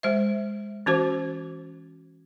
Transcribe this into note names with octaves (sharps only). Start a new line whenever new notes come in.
G#3 C5 E5
E3 C#4 F#4 C5